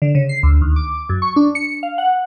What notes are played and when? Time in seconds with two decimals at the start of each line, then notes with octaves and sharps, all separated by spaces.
0.02 D3
0.15 C#3
0.29 C7
0.43 D2
0.62 D#2
0.76 D6
1.09 F#2
1.22 C#6
1.36 D4
1.55 C#7
1.83 F5
1.98 F#5